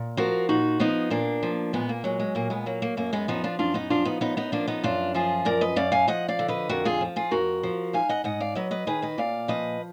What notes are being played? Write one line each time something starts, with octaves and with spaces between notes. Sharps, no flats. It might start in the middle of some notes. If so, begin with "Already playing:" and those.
Already playing: A#2
F3 F#4 A#4
A#2 D#4 F#4
F3 B3 D#4
A#2 A#3 D4
F3
A#2 G#3 B3
A#3
F#3 G#3
G#3
A#2 A#3
G#3 B3
F#3 A#3
A#3
F#2 A#3
G#3 B3
F3 B3 D#4
D4 F4
F#2 D4 F4
B3 D#4
F3 D4 F4
B3 D#4
F#2 B3 D#4
B3 D#4
F3 A#3 D4
B3 D#4
F#2 D4 F4
F3 F4 G#4
F#2 A#4 D5
B4 D#5
F#2 D5 F5
F5 G#5
F3 D#5 F#5
D5 F5
D3
B4 D#5
F2 F#4 A#4
F4 G#4
F3
F4 G#4
F2 F#4 A#4
F3
G#2 F5 G#5
D#5 F#5
G#2 D#5 F#5
D5 F5
F#3 B4 D#5
B4 D#5
D#3 G#4 B4
B4 D#5
A#2 D5 F5
F3 B4 D#5